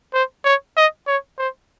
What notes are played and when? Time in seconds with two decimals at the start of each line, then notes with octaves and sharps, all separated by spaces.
0.14 C5
0.45 C#5
0.76 D#5
1.07 C#5
1.38 C5